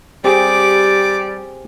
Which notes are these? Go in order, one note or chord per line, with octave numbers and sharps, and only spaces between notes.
G3 C4 G4 G#4 D6